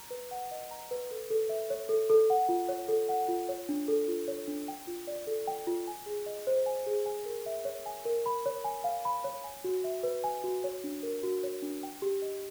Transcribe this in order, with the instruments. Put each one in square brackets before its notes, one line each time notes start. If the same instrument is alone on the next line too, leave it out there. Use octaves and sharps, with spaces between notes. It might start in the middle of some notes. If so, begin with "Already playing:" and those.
Already playing: [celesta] A#5
B4
F#5
D#5
A#5
B4
A4
A4
E5
C#5
A4
A4
F#5
F4
C#5
A4
F#5
F4
C#5
D4
A4
F4
C#5
D4
G5
F4
D5
A4
G5
F4
G#5
G#4
D#5
C5
G#5
G#4
G#5
A#4
E5
C#5
G#5
A#4
B5
C#5
G#5
F5
B5
C#5
G#5
F#4
E5
B4
G#5
F#4
C#5
D4
A#4
F#4
C#5
D4
G5
G4
D#5